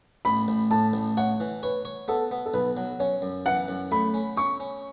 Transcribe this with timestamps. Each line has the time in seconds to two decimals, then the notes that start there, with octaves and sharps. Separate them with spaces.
0.25 A1 B5
0.48 A1
0.71 A2 A5
0.93 A1
1.17 C#5 F#5
1.40 E3
1.63 B4 C#5
1.85 C#5
2.08 B3 A4
2.31 B3
2.46 A4
2.54 B1 B4
2.77 F#3
3.00 C#4 C#5
3.22 F#2
3.46 E3 F#5
3.68 F#2
3.92 A3 B5
4.14 C#4
4.37 C#4 C#6
4.60 C#4